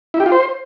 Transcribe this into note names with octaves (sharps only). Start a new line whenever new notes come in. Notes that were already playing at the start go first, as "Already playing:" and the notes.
E4
G4
F4
C5